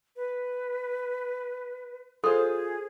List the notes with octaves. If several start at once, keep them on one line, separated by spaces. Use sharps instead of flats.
B4
F4 G#4 A4 C5 C6